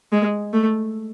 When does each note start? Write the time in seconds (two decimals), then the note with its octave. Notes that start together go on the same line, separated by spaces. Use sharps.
0.12 G#3
0.53 A3